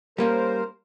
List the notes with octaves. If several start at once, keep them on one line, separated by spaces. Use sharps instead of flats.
G3 A#3 C#4 A#4 C5